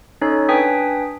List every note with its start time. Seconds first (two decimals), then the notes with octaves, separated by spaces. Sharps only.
0.21 C#4 D#4 A4 C#5
0.49 D4 B4 G5 G#5 D#6 B6